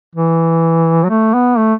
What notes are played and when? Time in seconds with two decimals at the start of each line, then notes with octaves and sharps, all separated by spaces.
0.15 E3
1.04 F#3
1.09 A3
1.34 B3
1.57 A3